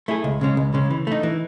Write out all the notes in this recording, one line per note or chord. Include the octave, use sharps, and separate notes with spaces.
A3 E4 G#4
C#2
C#3 G#3 C#4
C#2
C#3 G#3 C#4
E3
A3 D#4
E3